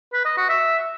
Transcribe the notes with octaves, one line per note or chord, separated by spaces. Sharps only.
B4
D#5
F#4
E5